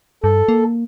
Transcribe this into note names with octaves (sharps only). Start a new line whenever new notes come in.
G2 A4
A#3